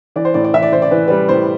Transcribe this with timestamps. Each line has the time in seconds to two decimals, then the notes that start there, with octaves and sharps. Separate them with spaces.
0.16 E3 D5
0.25 C5
0.34 A2 D5
0.44 D5
0.53 E3 E5
0.62 D5
0.72 E3 C5
0.82 D5
0.91 E3 B4
1.08 G3 B4
1.29 A2 C5